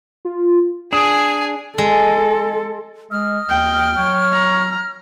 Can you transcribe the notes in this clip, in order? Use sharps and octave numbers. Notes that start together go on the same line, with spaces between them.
F4
D4 G#4 G#5 D#6 D7
G#3 A4
G#3 D#5 F6
D#2 G5
F#3 C#5
A#5